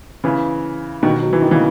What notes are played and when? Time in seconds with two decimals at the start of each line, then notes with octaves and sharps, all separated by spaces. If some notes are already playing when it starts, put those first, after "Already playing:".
0.24 C#3 E3
1.03 B2 D#3
1.23 F#3
1.33 E3
1.42 D#3
1.51 C#3 E3